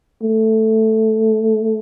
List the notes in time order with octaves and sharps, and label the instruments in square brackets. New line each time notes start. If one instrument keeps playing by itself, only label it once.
[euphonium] A3